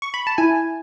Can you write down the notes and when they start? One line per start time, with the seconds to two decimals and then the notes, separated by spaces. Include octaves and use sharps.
0.02 C#6
0.14 B5
0.27 A5
0.38 E4 G#5